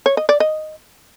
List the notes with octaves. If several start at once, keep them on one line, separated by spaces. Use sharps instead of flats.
C#5
D#5
D5
D#5